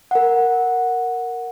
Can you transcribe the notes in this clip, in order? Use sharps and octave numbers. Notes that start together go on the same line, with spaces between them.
A#4 F#5